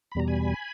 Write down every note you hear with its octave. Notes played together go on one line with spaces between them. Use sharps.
B5
E2 B2 G3 A#5
G#5 B5